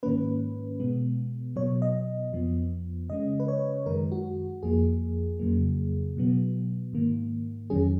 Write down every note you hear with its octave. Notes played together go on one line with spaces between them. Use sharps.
G#2 D#3 A#3 C#4 B4
B2 G#3 B3
B2 F#3 B3 C#5
D#5
F2 F3 B3
C#3 G#3 C#4 D#5
B4
C#5
F#2 D#3 G#3 A#4
F#4
F2 F3 A#3 G#4
F2 C#3 F#3 A#3
B2 F#3 B3
G#2 D#3 A#3
F2 D#3 F#3 C#4 G#4